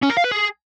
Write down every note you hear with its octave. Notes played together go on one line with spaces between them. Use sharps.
C#4
A#4
F5
B4
G#4